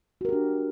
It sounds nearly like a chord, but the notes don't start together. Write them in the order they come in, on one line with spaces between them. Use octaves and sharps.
F#4 A#4 G4 D4